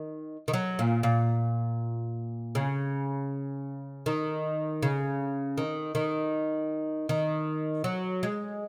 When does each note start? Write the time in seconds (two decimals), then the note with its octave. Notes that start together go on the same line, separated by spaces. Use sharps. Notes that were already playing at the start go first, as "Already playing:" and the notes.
Already playing: D#3
0.48 D#3
0.54 F#3
0.79 A#2
1.03 A#2
2.55 C#3
4.06 D#3
4.83 C#3
5.58 D#3
5.95 D#3
7.09 D#3
7.84 F#3
8.23 G#3